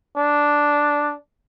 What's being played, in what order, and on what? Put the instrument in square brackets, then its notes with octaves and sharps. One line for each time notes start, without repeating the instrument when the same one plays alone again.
[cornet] D4